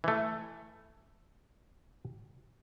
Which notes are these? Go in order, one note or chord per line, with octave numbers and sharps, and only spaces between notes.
E3 A3